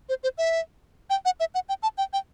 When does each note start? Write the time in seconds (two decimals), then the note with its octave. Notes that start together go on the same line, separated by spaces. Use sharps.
0.09 C5
0.23 C5
0.38 E5
1.10 G5
1.25 F#5
1.40 E5
1.55 F#5
1.69 G5
1.83 A5
1.98 G5
2.13 G5